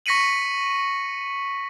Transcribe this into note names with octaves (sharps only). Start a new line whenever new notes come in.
C#6 A#6 B6 C#7 D#7 F#7